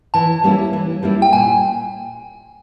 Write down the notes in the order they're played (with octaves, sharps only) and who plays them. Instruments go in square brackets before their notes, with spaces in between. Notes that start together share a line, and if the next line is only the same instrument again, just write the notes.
[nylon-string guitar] E3 [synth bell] A5
[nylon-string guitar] G3 A#3 C#4 E4
E3
G3 A#3 C#4 E4
[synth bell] G5
[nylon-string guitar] A#2 [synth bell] G#5